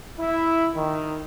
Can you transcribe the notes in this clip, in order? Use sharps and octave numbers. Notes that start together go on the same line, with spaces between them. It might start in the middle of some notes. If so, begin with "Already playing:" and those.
E4
D#3